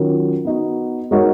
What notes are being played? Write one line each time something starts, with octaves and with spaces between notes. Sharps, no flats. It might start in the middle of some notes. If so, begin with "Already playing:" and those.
Already playing: D#3 F#3 C#4 F4 A#4
B3 D#4 F#4
G#3 D#4 F#4 A#4 C#5